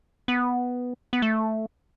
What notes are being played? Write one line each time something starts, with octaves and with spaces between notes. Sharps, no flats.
B3
B3
A3